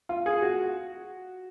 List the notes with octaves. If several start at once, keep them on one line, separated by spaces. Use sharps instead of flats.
F4
G#4
F#4